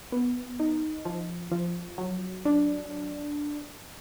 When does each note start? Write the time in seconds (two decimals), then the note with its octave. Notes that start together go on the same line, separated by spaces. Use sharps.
0.12 B3
0.60 D#4
1.05 F3
1.51 F3
1.98 F#3
2.45 D4